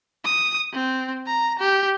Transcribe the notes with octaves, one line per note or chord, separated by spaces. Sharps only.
D#6
C4
A#5
G4